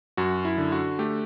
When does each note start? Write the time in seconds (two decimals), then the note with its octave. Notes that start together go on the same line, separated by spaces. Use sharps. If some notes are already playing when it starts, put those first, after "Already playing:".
0.17 F#2 F#4
0.45 E4
0.58 D3
0.72 F#4
0.99 A3 G4